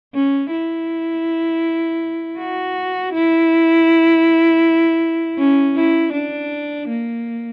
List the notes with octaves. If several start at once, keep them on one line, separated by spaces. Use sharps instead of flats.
C#4
E4
F#4
E4
C#4
E4
D4
A#3